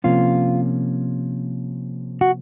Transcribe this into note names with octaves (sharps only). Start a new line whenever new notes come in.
C3 F3 A#3 C#4 F4
F#4